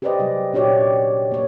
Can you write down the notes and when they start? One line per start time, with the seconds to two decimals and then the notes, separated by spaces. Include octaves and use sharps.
0.02 G4 G#4 B4 C5 D5 D#5
0.19 C3 F#3 G3 G#4
0.53 A#2 D4 F#4 G4 C#5 D5
1.31 A#3 C#5